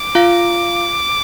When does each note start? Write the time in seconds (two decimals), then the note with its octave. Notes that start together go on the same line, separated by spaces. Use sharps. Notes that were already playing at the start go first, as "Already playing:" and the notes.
Already playing: D6
0.15 F4 F5